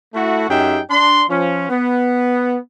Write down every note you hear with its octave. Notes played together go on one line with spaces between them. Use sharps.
A3 E4 F#4
F#2 D#4 G4 G#4 E5 G5
D4 C6
F3 C#4
B3